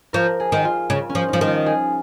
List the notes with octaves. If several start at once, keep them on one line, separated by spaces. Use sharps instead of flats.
F3 A#4
G#4
D#3
F4
C#3
C#4
F3
F3 D#4
D#3
F4
G#4